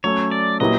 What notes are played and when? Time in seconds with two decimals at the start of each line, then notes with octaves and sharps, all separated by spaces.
0.04 F#3 A3 C#4 C#5
0.31 D5
0.60 A#2 F#3 B3 E4 G4 D#5